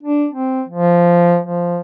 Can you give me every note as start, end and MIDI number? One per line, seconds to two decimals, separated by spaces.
0.03 0.26 62
0.32 0.63 60
0.68 1.39 53
1.44 1.80 53